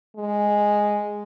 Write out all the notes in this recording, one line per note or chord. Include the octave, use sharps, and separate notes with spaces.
G#3